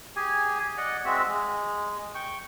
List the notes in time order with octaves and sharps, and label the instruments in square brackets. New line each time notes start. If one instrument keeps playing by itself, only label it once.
[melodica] G4 G#4 G#5
D5 D#5 F#5
G#3 C4 F#4 E5
G#3
G5 C#6